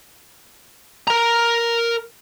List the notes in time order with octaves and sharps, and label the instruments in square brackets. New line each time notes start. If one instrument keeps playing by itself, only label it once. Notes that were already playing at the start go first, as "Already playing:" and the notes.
[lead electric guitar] A#4 A#5